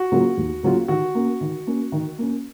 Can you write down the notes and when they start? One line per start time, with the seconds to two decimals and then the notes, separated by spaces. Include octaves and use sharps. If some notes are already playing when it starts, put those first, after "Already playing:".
Already playing: F#4
0.12 C#3 F#3 A#3 F4
0.37 D#2
0.63 C#3 F#3 A#3 F4
0.88 D#3 F#4
1.15 A#3 C#4
1.41 D#3
1.67 A#3 C#4
1.92 D#3
2.18 A#3 C#4